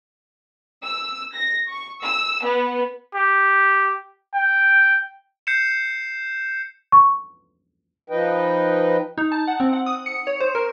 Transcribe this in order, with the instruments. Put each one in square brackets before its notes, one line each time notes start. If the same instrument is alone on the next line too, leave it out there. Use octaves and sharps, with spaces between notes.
[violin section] E6
A#6
C#6
E6
B3
[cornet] G4
G5
[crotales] G6 C7 C#7 E7
[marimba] C#6
[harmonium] F3 D#4 B4 D#5 G5
[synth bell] D#4
A5
F#5
C4
F#5
D#6
C#7
C#5
C5
A#4